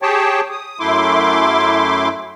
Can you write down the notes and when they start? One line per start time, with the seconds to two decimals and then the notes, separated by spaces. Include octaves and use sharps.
0.02 G4 G#4 C#5 G5 A5
0.51 D#6
0.80 F#2 A3 E4 C6 D6